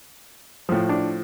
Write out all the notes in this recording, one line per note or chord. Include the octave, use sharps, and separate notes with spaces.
A2 F3
D4